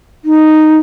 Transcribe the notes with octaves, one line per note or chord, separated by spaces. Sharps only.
D#4